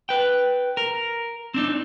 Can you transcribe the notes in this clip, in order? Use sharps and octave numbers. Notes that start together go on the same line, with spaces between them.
B4 G5
A#4
C4 D4 D#4